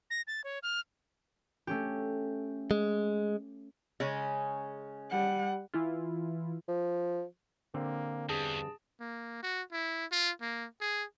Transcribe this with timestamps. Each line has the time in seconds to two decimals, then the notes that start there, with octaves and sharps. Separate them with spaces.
0.10 A#6
0.27 A6
0.44 C#5
0.63 F6
1.67 A3 C#4 G4
2.71 G#3
4.00 C#3 G#3 C#4
5.10 G3 F#5
5.74 E3 E4 F4
6.68 F3
7.74 D3 A#3 C4
8.29 E2 G2 G#4 A5
9.00 A#3
9.43 F#4
9.72 E4
10.12 F4
10.41 A#3
10.81 G#4